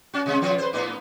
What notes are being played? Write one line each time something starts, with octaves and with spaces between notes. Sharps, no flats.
C#4 F#4
C3 G#3 C#4
B2 F3 F4
B4 C5
A2 B3 D#4